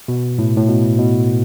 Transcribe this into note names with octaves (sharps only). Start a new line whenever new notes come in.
B2
A2
A2
B2
B2